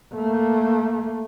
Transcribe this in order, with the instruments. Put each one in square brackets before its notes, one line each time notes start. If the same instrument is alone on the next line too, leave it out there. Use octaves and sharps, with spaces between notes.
[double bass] A3 A#3